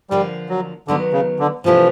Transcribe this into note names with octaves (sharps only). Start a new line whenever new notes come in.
D3 F3 G3 A#3
F#3
D3 D#3 F#3 B3
C#3
D3
C3 E3 F3 A3 D4 G4